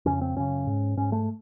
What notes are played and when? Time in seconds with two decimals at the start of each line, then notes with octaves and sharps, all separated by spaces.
0.06 F2 C#3 C#4
0.21 C4
0.36 F#2 C#3 C#4
0.67 G#2
0.97 G#2 C#4
1.12 A3